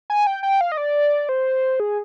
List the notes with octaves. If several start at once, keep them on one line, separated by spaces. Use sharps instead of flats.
G#5
G5
G5
F5
D#5
D5
C5
G#4